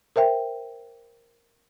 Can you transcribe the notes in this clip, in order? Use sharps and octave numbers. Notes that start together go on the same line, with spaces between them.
A#4 C5 E5 G5